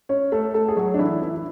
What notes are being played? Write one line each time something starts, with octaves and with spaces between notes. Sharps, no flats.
C#4 C#5
A3 A4
A3 A4
G#4
F#3 F#4
D4
E3 E4
E3 E4
E4